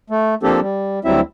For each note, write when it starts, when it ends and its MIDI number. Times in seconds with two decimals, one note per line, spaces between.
0.10 0.35 57
0.43 0.60 53
0.43 0.60 58
0.43 0.60 60
0.43 0.60 62
0.43 0.60 67
0.43 0.60 69
0.61 0.99 55
1.05 1.21 38
1.05 1.21 54
1.05 1.21 55
1.05 1.21 60
1.05 1.21 64
1.05 1.21 76